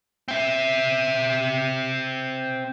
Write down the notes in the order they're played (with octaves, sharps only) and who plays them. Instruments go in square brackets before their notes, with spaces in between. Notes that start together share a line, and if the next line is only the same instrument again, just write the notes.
[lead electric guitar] C4 E5